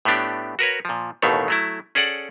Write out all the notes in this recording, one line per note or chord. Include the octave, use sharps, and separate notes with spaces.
A2 A3 B3 D4 G4
F#4 A#4 B4 C#5
A#2 F3
A1 D#2 B2 D#3 A3 C#5
F#3 A3 E4
C#4 G#4 A4 D5 F#5